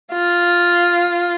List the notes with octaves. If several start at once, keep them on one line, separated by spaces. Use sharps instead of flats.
F4